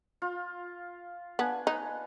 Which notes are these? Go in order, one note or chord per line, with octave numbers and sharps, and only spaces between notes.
F4
B3 D4 G#5
D#4 B4